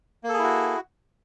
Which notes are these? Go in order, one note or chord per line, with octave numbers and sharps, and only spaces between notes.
A#3 E4 F#4 G#4 A4